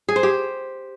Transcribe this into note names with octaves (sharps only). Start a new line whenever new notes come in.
G#4
C5
G4